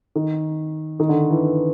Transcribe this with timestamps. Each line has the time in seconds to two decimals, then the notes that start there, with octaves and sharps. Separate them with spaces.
0.16 D#3
1.00 D#3
1.09 D3
1.31 E3